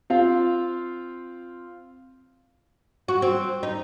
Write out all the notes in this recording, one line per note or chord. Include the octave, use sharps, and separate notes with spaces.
C4 F4 F5
F#4
C4
D#4